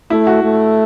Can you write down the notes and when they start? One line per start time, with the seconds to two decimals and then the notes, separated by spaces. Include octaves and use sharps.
0.10 A3 E4
0.27 F#4
0.44 A3